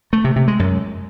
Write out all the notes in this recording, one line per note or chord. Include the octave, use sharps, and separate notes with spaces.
A3
C3
C3
G#3
F#2